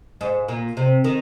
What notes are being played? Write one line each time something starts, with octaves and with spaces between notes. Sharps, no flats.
G#2
A#2
C3
D#3